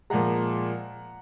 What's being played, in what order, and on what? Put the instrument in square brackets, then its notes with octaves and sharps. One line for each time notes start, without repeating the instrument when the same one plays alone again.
[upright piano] A#2 F3 G#3 F#5 A#5